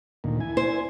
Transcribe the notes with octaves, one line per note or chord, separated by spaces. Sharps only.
D2 A#2 D#3
E4 G#5
C5